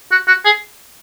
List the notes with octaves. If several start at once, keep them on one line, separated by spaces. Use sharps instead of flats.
F#4
F#4
G#4